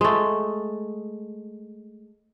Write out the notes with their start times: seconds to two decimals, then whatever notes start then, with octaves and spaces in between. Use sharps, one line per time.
0.01 G#3 A3